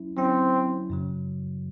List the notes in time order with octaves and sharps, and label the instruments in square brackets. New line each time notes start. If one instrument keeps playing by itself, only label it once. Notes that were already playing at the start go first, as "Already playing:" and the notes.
Already playing: [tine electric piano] F#3 C#4 E4
[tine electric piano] F#3 C#4 E4 [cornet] C4
[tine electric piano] F#2 C#3 F#3